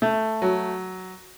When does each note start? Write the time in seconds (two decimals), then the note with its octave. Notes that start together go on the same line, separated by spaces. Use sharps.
0.02 A3
0.42 F#3